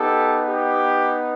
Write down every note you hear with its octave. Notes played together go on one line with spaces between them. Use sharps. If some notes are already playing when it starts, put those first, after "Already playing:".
Already playing: B3 D#4 G4 A4
G4